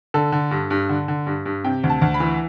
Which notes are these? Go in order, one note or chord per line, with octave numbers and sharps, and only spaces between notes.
D3 A4
D3
G2
G2
D3
D3
G2
G2
C3 G5
D2
A5
D2
B5
E3